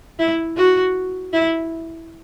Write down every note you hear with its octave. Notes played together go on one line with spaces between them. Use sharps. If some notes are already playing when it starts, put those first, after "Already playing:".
E4
F#4
E4